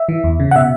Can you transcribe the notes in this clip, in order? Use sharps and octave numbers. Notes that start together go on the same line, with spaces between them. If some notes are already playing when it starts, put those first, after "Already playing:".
Already playing: E5
E3
E2
C#3
F#5
B2 E5